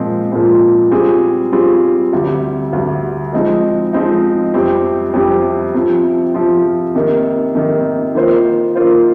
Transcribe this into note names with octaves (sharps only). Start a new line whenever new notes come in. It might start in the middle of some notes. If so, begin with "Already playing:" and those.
Already playing: A#2 F3 G#3 C4
A#2 F3 G#3 C4
G3 C4 F4 G#4
G3 C4 F4 G#4
D2 C3 G3
D2 C3 G3
F3 G#3 C4 D#4
F3 G#3 C4 D#4
F2 C3 G3 C4 G4
F2 C3 G3 C4 G4
C3 F3 C4 F4
C3 F3 C4 F4
C3 D#3 A#3
C3 D#3 A#3
D#3 A#3 F4 C5
D#3 A#3 F4 C5